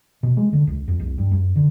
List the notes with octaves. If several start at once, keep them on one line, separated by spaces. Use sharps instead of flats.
B2
G#3
D3
C#2
F2
C2
G2
F#2
D3